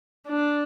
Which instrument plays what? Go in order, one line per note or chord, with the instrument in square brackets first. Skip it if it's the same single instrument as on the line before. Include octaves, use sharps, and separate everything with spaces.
[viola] D4